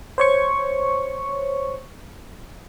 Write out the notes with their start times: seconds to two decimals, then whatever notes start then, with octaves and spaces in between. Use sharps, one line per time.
0.18 C5 C#5 C#6